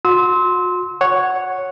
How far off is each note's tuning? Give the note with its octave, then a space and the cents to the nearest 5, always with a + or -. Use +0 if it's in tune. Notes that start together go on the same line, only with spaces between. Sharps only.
F#4 -40 C6 +0 E6 -35
C#5 +0 F#5 +0